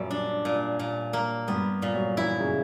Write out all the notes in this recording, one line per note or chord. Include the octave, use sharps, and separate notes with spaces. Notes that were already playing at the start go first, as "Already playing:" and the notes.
Already playing: F#2 A#2 G3
D4
A#2
A#2
A#3
G2 B3
A#2
F#3
E3 E4
C#3